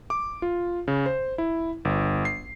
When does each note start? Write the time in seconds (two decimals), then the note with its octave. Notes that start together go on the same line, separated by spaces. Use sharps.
0.10 D6
0.42 F4
0.88 C#3
1.06 C5
1.38 E4
1.85 G1
2.25 C7